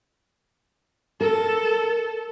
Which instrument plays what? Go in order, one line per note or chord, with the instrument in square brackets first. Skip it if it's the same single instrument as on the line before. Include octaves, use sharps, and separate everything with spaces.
[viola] A4 [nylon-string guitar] A#4